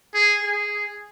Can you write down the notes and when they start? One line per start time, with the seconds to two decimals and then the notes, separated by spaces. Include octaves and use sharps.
0.14 G#4
0.43 G#4